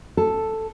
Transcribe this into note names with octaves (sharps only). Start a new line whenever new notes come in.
A4